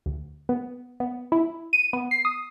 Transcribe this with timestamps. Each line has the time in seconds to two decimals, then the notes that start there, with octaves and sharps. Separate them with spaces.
0.06 D2
0.49 B3
1.00 B3
1.32 E4
1.73 D#7
1.93 B3
2.11 C7
2.25 D#6